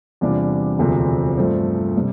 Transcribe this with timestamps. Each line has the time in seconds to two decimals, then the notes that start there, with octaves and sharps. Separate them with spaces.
0.21 E2 C3 G3 D4 F4
0.79 E1 D2 C3 F3 C4
1.37 G2 F3 A3 C4
1.97 C3 G3